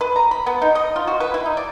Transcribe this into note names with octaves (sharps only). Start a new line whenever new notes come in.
B4
A#5
B5
B3
D#4
D#5
F4
F#4
B4
E4
D#4
D5